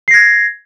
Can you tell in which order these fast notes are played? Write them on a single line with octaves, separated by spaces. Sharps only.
C7 A#6 G#6